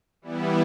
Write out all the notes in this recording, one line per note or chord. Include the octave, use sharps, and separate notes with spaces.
E3 G3 B3 E4